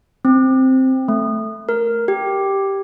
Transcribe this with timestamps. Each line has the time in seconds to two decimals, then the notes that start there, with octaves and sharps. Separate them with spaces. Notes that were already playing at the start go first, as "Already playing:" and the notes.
0.25 C4
1.08 A3
1.69 A#4
2.08 G4